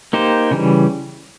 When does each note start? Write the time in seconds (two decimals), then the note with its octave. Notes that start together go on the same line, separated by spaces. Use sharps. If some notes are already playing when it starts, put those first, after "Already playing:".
0.13 A#3 D#4 G4 C5
0.51 C#3 E3 G3